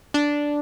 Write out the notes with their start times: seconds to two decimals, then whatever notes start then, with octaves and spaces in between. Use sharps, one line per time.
0.14 D4